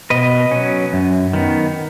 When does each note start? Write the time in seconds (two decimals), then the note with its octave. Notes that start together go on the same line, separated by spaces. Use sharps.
0.10 B2 B4 D#5
0.51 F#3 C#4
0.93 F#2
1.33 D#3 B3